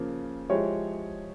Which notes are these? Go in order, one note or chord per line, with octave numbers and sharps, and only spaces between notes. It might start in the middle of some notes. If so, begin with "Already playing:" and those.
Already playing: C#3 F3 A#3
F3 G#3 E4 G4 C#5